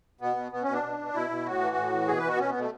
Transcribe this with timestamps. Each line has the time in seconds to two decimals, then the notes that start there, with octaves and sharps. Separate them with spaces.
0.21 B2 B3
0.36 B2
0.52 B2 B3
0.63 B2 C#4
0.73 D4
0.83 B2
0.99 B2
1.14 B2 E4
1.30 B2
1.45 A2 F#4
1.61 E3
1.76 A2
1.92 E3
2.08 B2 G#4
2.18 B4
2.23 B2 F#4
2.35 B3
2.39 B2 C#4
2.49 B3
2.55 B2 A3